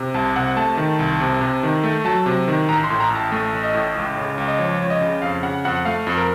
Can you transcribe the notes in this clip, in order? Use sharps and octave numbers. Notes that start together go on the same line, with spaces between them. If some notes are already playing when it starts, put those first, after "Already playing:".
Already playing: C3
C2 A5
C3 F#5
A3 A5
D#3
C2
C3
C3
D#3
A3
F#3 A5
C3
D#3
A1 A#5
C6
A2
A#5
A1
A5
A3
A1
D#5
A2
C#2
C#3
C#2
D#5
F3 C#5
C#2 C#5
D#5
C#3
F2 F5
C#3 F#5
F2 F#5
A3 F5
F2
A#4